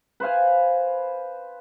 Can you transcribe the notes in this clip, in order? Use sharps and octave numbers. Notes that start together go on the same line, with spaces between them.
B4 C5 F5 G#5